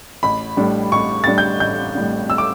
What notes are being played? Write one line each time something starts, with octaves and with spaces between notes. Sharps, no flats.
A1 B5
A2 G3 D4
A1 C#6
A2 G3 D4 A6
G6
A1 G6
A2 G3 D4
E6
D6